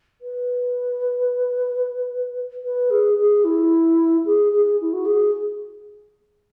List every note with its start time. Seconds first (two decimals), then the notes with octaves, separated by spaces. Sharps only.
0.21 B4
2.64 B4
2.90 G#4
3.18 G#4
3.44 E4
4.26 G#4
4.52 G#4
4.81 E4
4.93 F#4
5.06 G#4